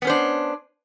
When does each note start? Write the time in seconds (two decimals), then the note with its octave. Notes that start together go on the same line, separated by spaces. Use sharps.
0.02 B3
0.05 C#4
0.07 C5
0.10 D4